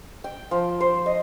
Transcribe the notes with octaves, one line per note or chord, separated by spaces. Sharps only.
G5
F3
C5
D#5